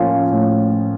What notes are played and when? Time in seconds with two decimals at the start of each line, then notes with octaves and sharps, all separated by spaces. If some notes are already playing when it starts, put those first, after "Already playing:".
Already playing: A2 F3 A#3 C#4 F4
0.31 A2